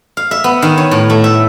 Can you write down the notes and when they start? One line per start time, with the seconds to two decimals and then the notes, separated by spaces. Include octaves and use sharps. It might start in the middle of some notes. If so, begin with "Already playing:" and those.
0.17 F5
0.31 E5
0.44 B3
0.62 D#3
0.78 C#5
0.91 A2
1.10 A3
1.24 E5